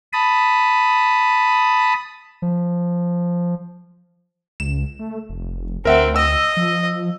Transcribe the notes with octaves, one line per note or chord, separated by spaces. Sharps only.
A5 B5 D#6
F3
C#2 E7
A3
F1
D2 C4 A#4 E5 F#5
D#5 E6
F3